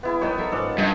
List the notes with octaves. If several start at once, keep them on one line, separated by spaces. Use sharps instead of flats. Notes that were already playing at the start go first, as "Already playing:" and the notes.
B3 E4 G#4
G3 A#3 B3 D#4 C#5
A#3 A4 E5
G#2 C#4 F4 A4 D5 F#5
G2 D#5 G5 G#5